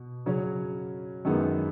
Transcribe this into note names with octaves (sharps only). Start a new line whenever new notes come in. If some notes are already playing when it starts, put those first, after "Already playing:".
Already playing: B2
C#3 F#3 C#4
F#2 D#3 G#3 B3